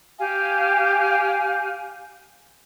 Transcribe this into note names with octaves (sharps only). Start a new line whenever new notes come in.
G4 F5 G#5